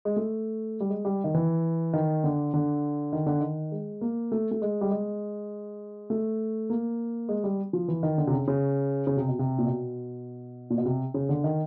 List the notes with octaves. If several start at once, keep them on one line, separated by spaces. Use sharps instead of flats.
G#3
A3
G3
G#3
G3
D#3
E3
D#3
D3
D3
D#3
D3
D#3
G#3
A#3
A3
A3
G#3
G3
G#3
A3
A#3
G#3
G3
F3
E3
D#3
D3
C3
C#3
C#3
C#3
C3
B2
C3
A#2
B2
A#2
B2
C3
C#3
D3
D#3